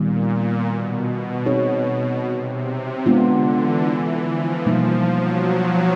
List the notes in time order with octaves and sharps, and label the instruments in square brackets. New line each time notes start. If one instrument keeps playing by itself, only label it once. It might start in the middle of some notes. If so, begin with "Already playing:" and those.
Already playing: [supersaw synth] A#2 [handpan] D#3 G3 B3
[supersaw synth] B2
[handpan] C4 D#4 G#4 C#5
[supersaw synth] C3
[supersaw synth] D3 [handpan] G#3 B3 D4 F4
[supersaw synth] E3
F3
[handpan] B2 G3 A#3 D#4
[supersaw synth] F#3